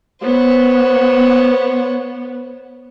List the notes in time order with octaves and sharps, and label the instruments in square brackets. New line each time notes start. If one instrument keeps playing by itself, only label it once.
[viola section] B3 [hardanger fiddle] C5 C#5